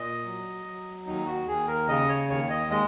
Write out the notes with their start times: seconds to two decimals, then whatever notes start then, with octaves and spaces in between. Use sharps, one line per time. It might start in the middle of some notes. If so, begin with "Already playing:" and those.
Already playing: A#2 D#5
0.25 F#3
0.66 F#3
1.07 D#2 D#4
1.27 F#4
1.48 D#2 G#4
1.68 A#4
1.89 C#3 D#5
2.09 C#5
2.29 D#2 C#5
2.50 D#5
2.70 G#3 D#5